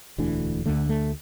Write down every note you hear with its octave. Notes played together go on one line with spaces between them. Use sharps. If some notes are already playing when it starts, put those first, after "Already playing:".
E1 D2 D3 E3
D2 D3 A3
A3